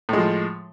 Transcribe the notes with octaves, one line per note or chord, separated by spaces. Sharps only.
A2 F3 G#3